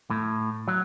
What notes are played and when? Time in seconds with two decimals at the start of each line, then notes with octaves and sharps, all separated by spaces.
0.10 A2
0.68 F#3